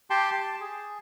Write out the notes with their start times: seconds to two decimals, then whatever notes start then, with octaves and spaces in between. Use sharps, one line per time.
0.10 G4 G5 A5 C6
0.32 A5
0.61 G#4